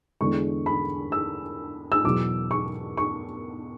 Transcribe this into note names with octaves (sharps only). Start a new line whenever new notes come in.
E2 D3 G#3 C#6
B5
E6
E6
E2 B2 F#3 D6
C#6
C#6